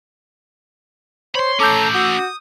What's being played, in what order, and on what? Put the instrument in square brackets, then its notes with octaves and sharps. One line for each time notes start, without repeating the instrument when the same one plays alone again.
[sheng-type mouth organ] C5 [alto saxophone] C#5 [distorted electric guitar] B5 C6
[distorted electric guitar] A3 C#4 [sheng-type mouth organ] A4 A#5 [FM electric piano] D6 E6 G6
[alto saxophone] F#4 [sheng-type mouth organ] D#6